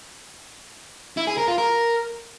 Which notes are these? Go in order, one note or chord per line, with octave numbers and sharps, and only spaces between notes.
E4
G#4
A#4
F4
A#4